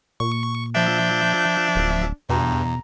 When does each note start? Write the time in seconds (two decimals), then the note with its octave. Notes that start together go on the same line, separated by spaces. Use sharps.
0.20 A#2 C#6
0.75 F3 D4 E5 G6
1.75 D1
2.29 E2 G2 B2 A#5